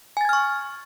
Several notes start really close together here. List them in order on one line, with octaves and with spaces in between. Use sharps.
G#5 A6 G#6 F6 C#6